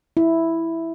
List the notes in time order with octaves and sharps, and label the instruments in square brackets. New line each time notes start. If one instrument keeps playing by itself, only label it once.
[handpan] E4